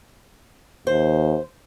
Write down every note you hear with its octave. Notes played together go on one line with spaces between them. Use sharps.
D#2 C5